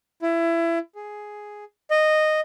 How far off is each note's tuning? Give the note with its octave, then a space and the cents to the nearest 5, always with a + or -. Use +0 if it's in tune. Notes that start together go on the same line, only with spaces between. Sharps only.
E4 +25
G#4 +5
D#5 -10